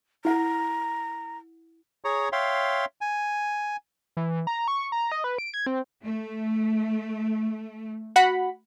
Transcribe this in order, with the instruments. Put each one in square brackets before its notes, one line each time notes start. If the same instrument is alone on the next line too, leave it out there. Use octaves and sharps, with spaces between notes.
[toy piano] E4 F#5 [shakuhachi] A#5
[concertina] G#4 C#5 A#5 C#6
C#5 E5 F5 G5 C6
G#5
[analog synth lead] E3
A#5
C#6
A#5
D#5
B4
D7
G#6
C4
[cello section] A3
[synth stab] F#4 F#5 B5